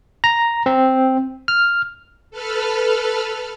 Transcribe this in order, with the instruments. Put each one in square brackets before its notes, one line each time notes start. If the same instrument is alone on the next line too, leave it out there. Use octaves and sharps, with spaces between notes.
[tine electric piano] A#5
C4
F6
[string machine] A4 B4 F6